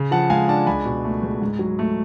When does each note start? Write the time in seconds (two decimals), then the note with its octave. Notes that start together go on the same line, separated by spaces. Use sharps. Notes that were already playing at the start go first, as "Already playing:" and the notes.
Already playing: C#3
0.11 F3 F#5 A5
0.30 G#3 F5 G#5
0.48 D4 F#5 A5
0.67 C#2 G#5 B5
0.85 B2
1.04 A3
1.23 C#2
1.42 G#2
1.59 F#3
1.79 A3